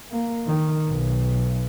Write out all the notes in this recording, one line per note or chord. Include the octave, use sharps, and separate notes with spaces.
A#3
D#3
B1